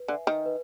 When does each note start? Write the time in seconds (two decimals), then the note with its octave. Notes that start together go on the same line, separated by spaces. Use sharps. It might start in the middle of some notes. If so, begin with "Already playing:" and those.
Already playing: B4
0.08 D3 E5 G#5
0.27 D#3
0.46 B4